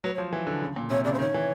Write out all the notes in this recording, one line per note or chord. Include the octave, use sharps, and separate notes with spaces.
F#3 B4
C#5
F3
E3
D3
C#3
A#2
C3 C#5
C#3 D5
C5
D#3 C#5
E3